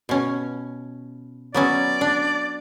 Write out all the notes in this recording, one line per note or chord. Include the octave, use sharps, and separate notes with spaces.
B2 C#4
F#3 B3 C#4 D5
D4